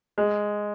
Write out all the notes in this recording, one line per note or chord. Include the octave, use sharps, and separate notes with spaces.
G#3